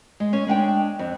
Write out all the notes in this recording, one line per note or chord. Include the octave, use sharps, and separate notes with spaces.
G#3
C#4
G#3 D4 F#5 G5
F2